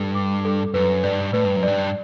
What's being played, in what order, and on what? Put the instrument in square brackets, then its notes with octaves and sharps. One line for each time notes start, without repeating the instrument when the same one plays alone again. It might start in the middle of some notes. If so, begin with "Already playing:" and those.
Already playing: [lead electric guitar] G2 [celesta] A4
[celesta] D6
A4
[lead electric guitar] F#2 [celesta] B4
[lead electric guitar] G2 [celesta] D5
[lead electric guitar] A2 [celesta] B4
[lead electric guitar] G2
F#2
[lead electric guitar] G2 [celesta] D5